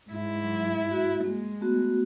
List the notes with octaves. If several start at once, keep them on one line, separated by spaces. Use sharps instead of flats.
G#2 E4
F#3
F#4
G#3 A#3
A3 B3 F#4